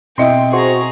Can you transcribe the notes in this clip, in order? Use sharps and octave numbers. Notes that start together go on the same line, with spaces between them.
B2 C4 E4 D#5 E5 G5 C6
F#4 G#4 C5 A#5 C#6